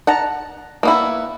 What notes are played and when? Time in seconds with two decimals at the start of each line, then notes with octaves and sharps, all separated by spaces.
0.07 F#5 A5 A#5
0.83 A#3 B3 E4